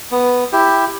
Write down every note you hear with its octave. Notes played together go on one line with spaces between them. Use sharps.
B3
E4 G4